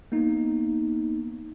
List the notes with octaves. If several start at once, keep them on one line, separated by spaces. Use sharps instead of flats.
A#3 B3 D#4